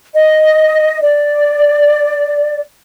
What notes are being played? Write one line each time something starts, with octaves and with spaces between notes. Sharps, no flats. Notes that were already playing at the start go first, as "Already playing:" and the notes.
D#5
D5